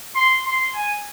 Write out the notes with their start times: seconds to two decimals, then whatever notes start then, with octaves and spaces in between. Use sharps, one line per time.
0.15 C6
0.45 C6
0.75 G#5